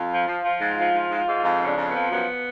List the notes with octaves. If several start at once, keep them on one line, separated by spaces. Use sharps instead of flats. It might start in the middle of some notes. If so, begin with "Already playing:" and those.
Already playing: F2 F4
F3
F3
F3
G#2
F3
G#2
G#2
G#2
F2 F4
C#3
D4
F2
B3
F3
F#2 B3